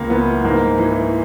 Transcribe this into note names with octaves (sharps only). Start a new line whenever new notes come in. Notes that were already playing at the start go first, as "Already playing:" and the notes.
Already playing: C#2 A#3
E3 B3
G#2 A#3
E3